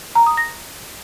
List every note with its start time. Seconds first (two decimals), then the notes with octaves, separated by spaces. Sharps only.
0.15 A#5
0.26 D#6
0.37 A#6